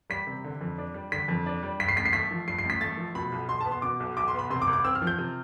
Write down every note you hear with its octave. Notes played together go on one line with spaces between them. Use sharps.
G3 B6
C3
D3
F2
D4
G3
D3 B6
F2
D4
G3
G2 B6
C7
A1 B6
C7
A3 B6
F3
G2 C7
C7
A1
B6
A3 A6
F3
B2 B5
B1
B1 C6
A5
B3
C6
B2 D6
B1
B1 D6
C6
B3 B5
C3 C6
D6
C2
D6
C4 E6
F6
F3
G6
C3